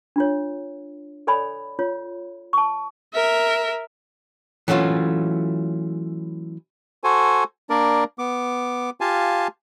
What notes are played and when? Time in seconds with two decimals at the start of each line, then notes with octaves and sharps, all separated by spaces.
0.16 D4 F4 C#5
1.27 A4 C#5 D5 G#5 B5
1.79 F4 C#5
2.53 A5 C#6
3.14 A#4 E5
4.68 E3 F#3 A3 C#4 F4
7.04 F#4 A4 C5 G#5
7.70 A#3 D4 A#4 D5
8.19 B3 D6
9.01 F4 G4 F5 G#5 A5